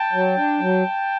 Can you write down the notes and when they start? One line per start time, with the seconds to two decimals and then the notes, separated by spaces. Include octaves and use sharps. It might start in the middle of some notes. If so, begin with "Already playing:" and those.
Already playing: G5 A5
0.12 F#3
0.37 D4
0.60 F#3